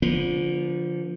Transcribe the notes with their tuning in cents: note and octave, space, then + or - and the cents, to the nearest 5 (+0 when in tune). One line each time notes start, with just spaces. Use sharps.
D3 -25 F3 +0 B3 -40